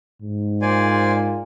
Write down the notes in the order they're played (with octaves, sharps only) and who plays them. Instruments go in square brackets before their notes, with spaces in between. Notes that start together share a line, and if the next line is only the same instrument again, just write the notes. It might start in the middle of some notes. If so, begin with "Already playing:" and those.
[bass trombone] G#2
[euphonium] A#2 [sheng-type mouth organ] C5 D5 G#5